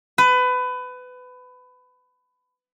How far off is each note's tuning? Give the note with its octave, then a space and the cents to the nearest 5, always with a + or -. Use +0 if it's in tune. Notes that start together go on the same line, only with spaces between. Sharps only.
B4 +25